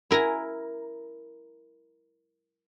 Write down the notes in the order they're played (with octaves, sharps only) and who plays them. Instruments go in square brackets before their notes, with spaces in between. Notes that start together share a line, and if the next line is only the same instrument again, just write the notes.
[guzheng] E4 A#4 G#5 A#5